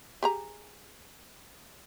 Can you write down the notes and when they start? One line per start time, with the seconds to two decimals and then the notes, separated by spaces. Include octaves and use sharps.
0.23 G4 G#4 A#5